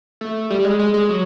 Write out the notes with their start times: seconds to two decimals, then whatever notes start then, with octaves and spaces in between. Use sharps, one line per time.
0.21 A3
0.50 G3
0.65 G#3
0.79 G#3
0.94 G#3
1.09 F#3